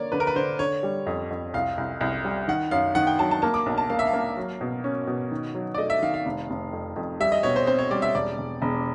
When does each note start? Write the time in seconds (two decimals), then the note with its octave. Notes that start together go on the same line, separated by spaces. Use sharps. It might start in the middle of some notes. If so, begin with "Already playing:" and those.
Already playing: D3 A#3 C#5 D5
0.12 D3 B4
0.20 A#4
0.27 B4
0.36 D3 C5
0.59 D3 C#5
0.83 G3
1.07 F2
1.30 F2
1.54 C2 F5
1.78 C2
2.01 C2
2.25 G3
2.48 D#3 F#5
2.71 F#2 F5
2.95 D#3 F#5
3.07 G5
3.19 F#3 A5
3.31 A5
3.42 A#3 A5
3.54 D6
3.66 B1
3.78 A5
3.90 A#3 F5
3.99 E5
4.07 F5
4.13 A#3
4.37 F#3
4.61 B2
4.84 C#4
5.07 B2
5.31 D#3
5.55 F#3
5.74 D5
5.78 A3 D#5
5.90 E5
6.02 D#3 F5
6.14 F5
6.26 F1
6.50 F1
6.73 F2
6.96 F2
7.20 G3 E5
7.32 D#5
7.43 B2 C#5
7.56 C5
7.67 C4 C5
7.78 C#5
7.91 G3 D5
8.02 E5
8.15 E1 D5
8.38 E1
8.62 E1